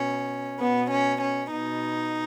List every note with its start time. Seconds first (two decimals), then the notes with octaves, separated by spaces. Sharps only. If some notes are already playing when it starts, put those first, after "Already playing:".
Already playing: B2 C#4
0.60 B2 B3
0.91 C#4
1.21 C#4
1.51 B2 D#4